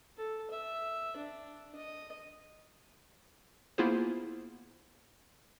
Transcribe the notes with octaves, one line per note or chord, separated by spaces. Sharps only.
A4
E5
D4
D#5
A#3 B3 E4 F4 G#4 C5